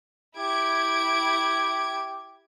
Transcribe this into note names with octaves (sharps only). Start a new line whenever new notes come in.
E4 G4 G#6 D7